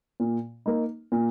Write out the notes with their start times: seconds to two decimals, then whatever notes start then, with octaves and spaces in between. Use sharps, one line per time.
0.20 A#2
0.66 A#3 D#4
1.12 A#2